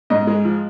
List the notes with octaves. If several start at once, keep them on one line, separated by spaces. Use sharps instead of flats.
G#2 D#5
G#3
F3